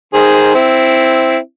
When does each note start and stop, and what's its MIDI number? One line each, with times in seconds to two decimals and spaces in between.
0.14 0.54 51
0.14 0.54 68
0.14 0.54 72
0.55 1.37 60
0.55 1.37 64